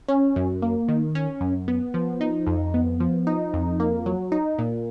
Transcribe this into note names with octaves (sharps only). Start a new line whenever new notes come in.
C#4
F#2
A#3
D#3
C#4
F#2
B3
F3
D#4
F2
B3
F3
D#4
F2
A#3
F#3
D#4
A#2